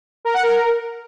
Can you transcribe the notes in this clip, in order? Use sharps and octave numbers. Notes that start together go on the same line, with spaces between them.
A#4
F#5
A#4